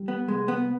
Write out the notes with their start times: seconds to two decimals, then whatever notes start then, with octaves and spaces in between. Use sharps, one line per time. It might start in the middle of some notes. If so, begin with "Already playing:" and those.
Already playing: G3
0.08 B3
0.28 C2 G#3
0.48 B3